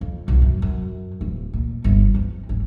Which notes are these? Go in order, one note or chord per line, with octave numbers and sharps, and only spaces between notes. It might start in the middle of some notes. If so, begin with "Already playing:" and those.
F2
B1
F#2
F#2
D1
A#2
G1
C4
G#1